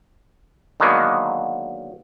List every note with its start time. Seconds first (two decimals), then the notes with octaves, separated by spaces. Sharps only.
0.80 D3 D#3 F#3 G#3 A#3 B3